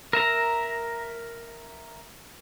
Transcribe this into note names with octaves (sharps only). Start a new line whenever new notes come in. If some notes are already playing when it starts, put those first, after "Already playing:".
A#4 E5 A#5